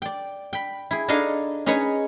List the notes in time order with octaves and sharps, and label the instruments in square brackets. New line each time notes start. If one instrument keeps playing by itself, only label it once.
[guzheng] D5 G5
G5 B5
E4 G#4
D4 D#4 A4 D#5 F5 G#5
C#4 D#4 G#4 B4 C#5 D#5